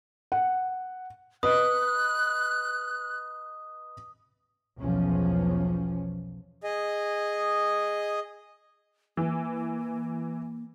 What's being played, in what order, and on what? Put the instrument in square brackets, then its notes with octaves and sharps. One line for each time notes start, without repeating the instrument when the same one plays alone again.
[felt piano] F#5
[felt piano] B4 D#5 [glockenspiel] D#6 [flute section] F#6
[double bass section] B1 E2 F3 C#4
[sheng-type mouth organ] G#4 D#5
[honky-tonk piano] E3 [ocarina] A#3